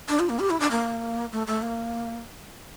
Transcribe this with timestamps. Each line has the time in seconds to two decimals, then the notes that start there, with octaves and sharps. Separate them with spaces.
0.09 D4
0.20 F4
0.29 A#3
0.40 G4
0.50 E4
0.60 D4
0.71 A#3
1.32 A3
1.47 A3
1.62 A#3